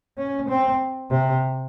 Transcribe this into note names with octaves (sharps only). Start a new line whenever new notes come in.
C#4
C4
C3